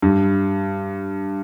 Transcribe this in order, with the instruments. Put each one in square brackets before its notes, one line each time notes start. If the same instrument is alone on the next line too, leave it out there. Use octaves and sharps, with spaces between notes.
[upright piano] G2